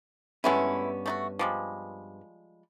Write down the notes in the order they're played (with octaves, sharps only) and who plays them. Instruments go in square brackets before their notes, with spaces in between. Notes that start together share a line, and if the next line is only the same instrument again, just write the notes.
[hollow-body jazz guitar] G2 B3 C#4 [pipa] G#3 A3 E4
[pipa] A3 D#4 F#4
F3 G3 G#3